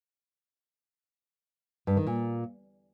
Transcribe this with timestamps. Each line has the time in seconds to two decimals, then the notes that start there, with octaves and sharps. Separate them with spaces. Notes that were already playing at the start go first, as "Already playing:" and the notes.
1.87 G2
1.97 D#3
2.07 A#2